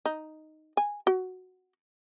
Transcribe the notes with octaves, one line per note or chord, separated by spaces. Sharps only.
D#4
G#5
F#4